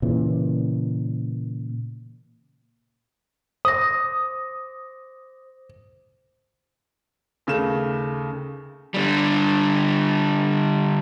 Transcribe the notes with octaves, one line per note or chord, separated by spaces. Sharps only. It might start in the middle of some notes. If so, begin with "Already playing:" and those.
A#2 C#3 E3
C5 D6 D#6 A#6
D#2 C#3 A3 E7
D3 G3